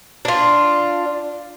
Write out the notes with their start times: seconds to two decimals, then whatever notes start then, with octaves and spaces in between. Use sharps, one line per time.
0.25 D4 F4